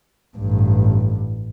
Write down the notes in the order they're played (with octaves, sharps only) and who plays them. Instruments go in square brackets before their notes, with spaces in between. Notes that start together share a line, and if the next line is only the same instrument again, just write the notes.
[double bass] A1 G2